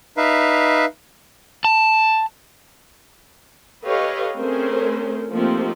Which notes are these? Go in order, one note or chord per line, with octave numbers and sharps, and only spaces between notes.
D#4 B4 E5 F5
A5
G4 A4 B4 C#5 D#5 F5
A3 C4 C#4 G#4 A#4 C5
F3 A3 A#3 C4 D#4 G4